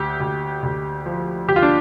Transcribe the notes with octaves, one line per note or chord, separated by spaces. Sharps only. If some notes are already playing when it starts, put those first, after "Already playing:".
Already playing: D2 G4
D2
D2
F3
D2 G4
F4
D4